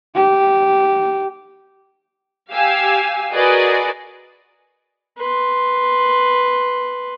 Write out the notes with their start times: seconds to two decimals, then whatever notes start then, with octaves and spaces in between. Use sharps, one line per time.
0.16 G4
2.52 G4 F5 G#5 E6
3.32 F#4 G#4 A#4 B4 D5 D#5
5.18 B4 C6